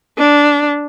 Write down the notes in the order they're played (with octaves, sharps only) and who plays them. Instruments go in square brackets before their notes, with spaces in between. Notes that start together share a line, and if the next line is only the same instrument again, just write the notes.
[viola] D4